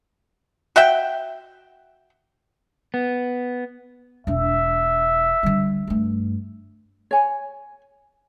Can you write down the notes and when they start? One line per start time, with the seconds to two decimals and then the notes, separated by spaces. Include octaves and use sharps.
0.76 F#4 E5 G5
2.94 B3
4.27 E1 D4 E5
5.43 D3 G3
5.87 G2 A3
7.11 C#5 G#5